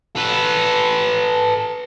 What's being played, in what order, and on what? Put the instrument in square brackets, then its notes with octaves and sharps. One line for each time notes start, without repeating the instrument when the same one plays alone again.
[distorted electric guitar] A4 B4